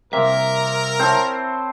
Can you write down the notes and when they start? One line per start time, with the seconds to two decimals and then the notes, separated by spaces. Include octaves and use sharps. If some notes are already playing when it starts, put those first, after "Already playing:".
0.13 C2 A#3 C4 A#4 E5
0.99 C4 E4 C#5 A5